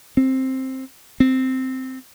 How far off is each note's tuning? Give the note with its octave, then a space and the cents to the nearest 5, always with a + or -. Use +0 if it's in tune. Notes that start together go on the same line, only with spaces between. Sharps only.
C4 +10
C4 -5